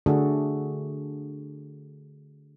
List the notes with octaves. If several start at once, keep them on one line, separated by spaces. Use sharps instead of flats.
D3 A3 D4 F#4 G#4 A4